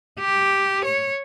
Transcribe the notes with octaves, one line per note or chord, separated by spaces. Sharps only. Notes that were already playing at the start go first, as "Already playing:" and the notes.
G4
C#5